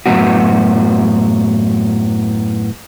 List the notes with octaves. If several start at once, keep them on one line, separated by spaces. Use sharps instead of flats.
F#2 A2 D3 F#3 B3 F#4